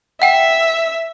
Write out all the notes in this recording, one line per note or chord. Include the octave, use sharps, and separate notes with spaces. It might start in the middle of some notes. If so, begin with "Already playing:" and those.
E5 F#5 G5